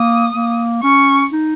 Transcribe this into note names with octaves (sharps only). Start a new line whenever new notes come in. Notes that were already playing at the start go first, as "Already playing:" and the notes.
Already playing: A#3 D#6
A#3
C#4 C#6
D#4